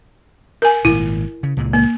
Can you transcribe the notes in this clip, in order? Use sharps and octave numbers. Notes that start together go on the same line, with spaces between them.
A#4 G#5
G#1 A#2 E4
C#3
C#2 A#2 G#3
A#3